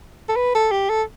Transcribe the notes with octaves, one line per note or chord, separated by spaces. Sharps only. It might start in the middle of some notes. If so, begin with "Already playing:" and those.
A4
B4
A4
G4
A4